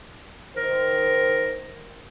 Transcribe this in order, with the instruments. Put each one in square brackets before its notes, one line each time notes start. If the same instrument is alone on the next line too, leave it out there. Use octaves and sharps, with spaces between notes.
[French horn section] D#3 C5 [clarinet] A#4